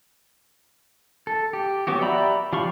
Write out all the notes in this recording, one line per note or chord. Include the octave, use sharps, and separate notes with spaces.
A4
G4
F#3 B3 F#4 G4
G4 D5 E5 A#5 B5
F3 G4 F5 B5 C#6